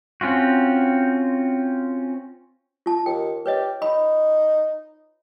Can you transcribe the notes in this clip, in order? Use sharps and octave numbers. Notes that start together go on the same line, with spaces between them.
C4 C#4 F4 F#4
F4 A5
D#2 G5
G4 B4 C#5 D#5
D#4 B5